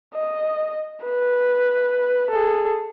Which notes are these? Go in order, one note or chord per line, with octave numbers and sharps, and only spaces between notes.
D#5
B4
G#4 A4